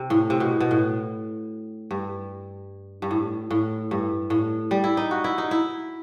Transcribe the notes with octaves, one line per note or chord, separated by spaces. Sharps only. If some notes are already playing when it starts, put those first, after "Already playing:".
Already playing: C3
A2
C3
B2
B2
A2
G2
G2
A2
A2
G2
A2
G3
E4
D#4
F#4
E4
D#4
E4